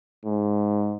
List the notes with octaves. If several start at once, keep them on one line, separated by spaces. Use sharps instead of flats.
G#2